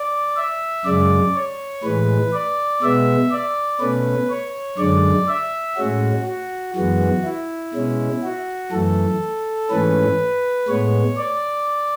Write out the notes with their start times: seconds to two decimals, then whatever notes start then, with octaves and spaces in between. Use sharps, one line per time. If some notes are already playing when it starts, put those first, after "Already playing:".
Already playing: D5
0.36 E5
0.85 F#2 C#3 G#3 D5
1.34 C#5
1.83 A2 E3 G#3 B4
2.33 D5
2.82 B2 G#3 B3 E5
3.32 D5
3.80 B2 A3 C#4 B4
4.30 C#5
4.78 F#2 D3 G#3 D5
5.28 E5
5.77 A2 G#3 C#4 F#4
6.26 F#4
6.75 F#2 E3 G#3 B3 F#4
7.24 E4
7.74 B2 G#3 C#4
8.23 F#4
8.72 F#2 E3 A3 A4
9.70 G#2 E3 A3 C#4 B4
10.68 A2 G#3 B3 C#5
11.17 D5